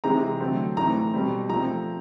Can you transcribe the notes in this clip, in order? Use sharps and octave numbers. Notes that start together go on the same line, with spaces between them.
C3 E3 G#3 C4 A#5
D3 F#3 A3 C4
A2 E3 A3 C4 A#5
B2 G3 C4
F3 A3 C4 A#5